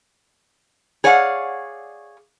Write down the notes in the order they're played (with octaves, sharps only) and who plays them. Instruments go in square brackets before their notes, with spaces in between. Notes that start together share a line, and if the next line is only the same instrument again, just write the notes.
[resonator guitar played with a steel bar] G#4 C#5 D5 F5 F#5